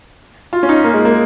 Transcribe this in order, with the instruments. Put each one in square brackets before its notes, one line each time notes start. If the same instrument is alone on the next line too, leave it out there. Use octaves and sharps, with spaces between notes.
[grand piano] F4
C#4
D#4
A#3
G#3
A#3